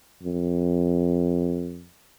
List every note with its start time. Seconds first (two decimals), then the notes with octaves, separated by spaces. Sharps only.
0.23 F2